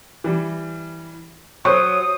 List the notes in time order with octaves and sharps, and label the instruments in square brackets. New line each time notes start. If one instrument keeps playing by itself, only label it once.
[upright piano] E3 G3
[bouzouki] F#3 [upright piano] C5 C#6 [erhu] D#6